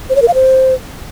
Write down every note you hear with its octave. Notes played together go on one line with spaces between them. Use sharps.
C5
C#5
A#4
F5
C5